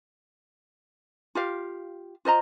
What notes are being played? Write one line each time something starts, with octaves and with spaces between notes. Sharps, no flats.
F4 G4 F5
F4 C5 D#5 A#5